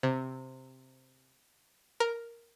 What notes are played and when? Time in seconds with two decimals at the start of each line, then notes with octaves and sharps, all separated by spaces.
0.03 C3
2.00 A#4